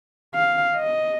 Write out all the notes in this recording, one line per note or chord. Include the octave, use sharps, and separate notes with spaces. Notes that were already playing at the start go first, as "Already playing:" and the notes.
F5
D#5